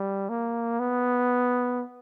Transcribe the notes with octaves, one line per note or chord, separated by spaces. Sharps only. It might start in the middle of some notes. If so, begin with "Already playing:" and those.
Already playing: G3
A#3
B3